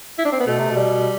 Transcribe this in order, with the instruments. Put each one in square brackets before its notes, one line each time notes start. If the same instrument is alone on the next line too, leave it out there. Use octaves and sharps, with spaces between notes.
[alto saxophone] E4
D4
C4
B3
[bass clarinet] B2 [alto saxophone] A3
[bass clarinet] C3
B2
[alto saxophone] G3